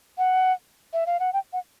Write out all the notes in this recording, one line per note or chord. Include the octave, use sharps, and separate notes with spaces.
F#5
E5
F5
F#5
G5
F#5